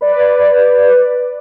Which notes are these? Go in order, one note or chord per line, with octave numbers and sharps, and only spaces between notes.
B4 D5